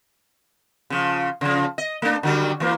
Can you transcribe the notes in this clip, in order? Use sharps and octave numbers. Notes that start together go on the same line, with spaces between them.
C#3 F3
C#3 F3
D#5
A3 D4
D3 F#3 G3
E3 A#3